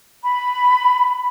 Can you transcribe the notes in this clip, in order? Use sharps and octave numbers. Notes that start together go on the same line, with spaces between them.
B5